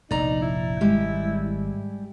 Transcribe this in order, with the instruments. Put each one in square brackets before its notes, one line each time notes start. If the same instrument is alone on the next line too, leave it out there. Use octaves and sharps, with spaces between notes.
[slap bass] F1 A#1 [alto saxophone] D#4 [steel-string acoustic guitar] D5 A#5
[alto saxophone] E4
[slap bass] G#1 [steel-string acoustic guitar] G3 G#3 G4